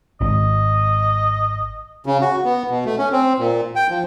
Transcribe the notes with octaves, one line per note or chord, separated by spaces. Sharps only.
G#1 D#5
C#3
F#4
B3
B2
A3
C#4
C4
A#2
G5
F3